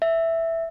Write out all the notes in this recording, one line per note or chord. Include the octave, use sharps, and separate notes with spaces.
E5